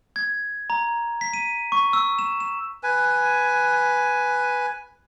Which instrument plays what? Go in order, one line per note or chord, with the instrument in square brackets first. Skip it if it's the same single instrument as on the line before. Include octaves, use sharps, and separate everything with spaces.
[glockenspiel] G#6
A#5
B6
D#7
C#6
E6
E7
E7
[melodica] B4 G#5